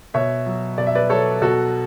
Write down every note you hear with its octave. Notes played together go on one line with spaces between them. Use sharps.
B2 C#5 E5
F#3
B2 D5
E5
B4 D5
F#3 A4 C#5
B2 F#4 A4